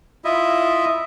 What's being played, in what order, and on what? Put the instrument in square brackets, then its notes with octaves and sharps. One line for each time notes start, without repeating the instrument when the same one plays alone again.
[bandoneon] E4 F4 D#5 E5